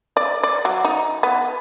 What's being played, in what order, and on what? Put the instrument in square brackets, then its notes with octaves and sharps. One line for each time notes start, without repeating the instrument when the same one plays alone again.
[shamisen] D5
D5
F#3
D#4
B3